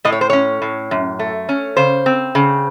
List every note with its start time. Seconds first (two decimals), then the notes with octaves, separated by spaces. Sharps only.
0.05 A2 D#5
0.12 C#5
0.21 C5
0.30 C#4 C#5
0.62 A2
0.91 F#2
1.19 A3
1.49 C#4
1.77 C#3 C5
2.06 C4
2.35 C#3